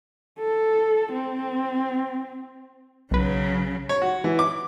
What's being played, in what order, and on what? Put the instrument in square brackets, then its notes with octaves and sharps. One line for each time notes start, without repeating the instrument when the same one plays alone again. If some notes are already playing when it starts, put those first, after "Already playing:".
[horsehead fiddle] A4
C4
[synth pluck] B1 B4 [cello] C#3 F#3
[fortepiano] C#5
F#4
E3
D6